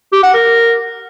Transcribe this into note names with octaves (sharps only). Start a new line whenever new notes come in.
G4
F#5
A#4